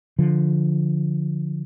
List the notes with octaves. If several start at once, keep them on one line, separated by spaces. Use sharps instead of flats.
D3 F3